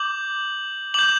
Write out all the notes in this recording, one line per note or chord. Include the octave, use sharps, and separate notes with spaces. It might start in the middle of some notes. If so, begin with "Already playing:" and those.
Already playing: D6 G6 F#7
D6 G6 F#7